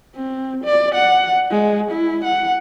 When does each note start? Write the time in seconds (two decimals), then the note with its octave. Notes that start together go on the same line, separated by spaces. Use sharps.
0.15 C4
0.64 D5
0.95 F#5
1.51 G#3
1.91 E4
2.24 F#5